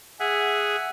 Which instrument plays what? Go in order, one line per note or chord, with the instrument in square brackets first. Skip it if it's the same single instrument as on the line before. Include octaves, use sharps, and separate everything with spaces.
[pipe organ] G#4 [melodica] E5 F#5